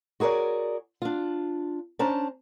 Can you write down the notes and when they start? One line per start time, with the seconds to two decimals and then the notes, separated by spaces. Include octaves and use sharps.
0.20 F#4 G#4 A#4 C#5 D5
1.02 D4 F4
1.99 C#4 D4 C5 A5 A#5